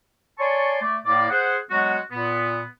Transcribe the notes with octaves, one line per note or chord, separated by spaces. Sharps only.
C#5 D5 G#5 A5 C6 C#6
A3 D5
A2 A#3 D5
G#4 C5 F#5
F#3 G#3 B3 F#4
A#2 B3